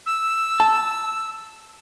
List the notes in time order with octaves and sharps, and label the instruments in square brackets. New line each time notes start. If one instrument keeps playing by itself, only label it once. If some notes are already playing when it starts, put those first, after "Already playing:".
[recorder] E6
[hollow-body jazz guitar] A5